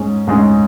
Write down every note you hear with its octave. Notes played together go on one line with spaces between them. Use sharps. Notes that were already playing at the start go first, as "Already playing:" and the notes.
Already playing: G#2 G#3 C#4
G#2 G#3 C#4